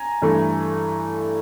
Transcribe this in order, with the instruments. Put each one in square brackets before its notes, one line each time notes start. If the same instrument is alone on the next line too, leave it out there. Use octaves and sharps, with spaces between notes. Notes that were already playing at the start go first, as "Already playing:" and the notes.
Already playing: [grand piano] G#5 A#5
G2 E3 A3